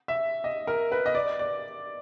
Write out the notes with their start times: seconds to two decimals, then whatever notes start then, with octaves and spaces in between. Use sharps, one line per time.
0.08 E5
0.44 D#5
0.67 A#4
0.92 B4
1.06 D#5
1.15 D5
1.39 D5